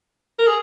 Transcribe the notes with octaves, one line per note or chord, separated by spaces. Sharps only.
A#4
G#4